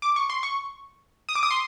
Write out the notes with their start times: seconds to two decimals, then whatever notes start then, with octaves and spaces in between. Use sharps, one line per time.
0.02 D6
0.16 C#6
0.30 C6
0.43 C#6
1.29 D#6
1.35 D6
1.43 D#6
1.51 C6